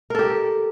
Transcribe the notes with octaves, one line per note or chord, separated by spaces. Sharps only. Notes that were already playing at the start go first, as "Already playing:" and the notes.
G4 A4 A#4